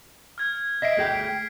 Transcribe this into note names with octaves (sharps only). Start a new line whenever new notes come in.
F6 G#6
D#5 E5 B6 C7 D7
A3 G#4 G5